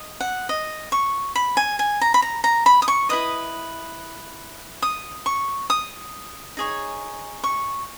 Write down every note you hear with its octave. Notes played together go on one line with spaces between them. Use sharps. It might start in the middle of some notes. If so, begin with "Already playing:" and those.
Already playing: D#5
F#5
D#5
C#6
B5
G#5
G#5
A#5
B5
A#5
A#5
B5
D#6
C#6
E4 B4 D#5 D#6
D#6
C#6
D#6
D#4 G#4 C#5
C#6